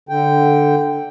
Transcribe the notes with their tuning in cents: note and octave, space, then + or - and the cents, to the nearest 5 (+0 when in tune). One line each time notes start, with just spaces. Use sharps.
D3 +0 G5 +0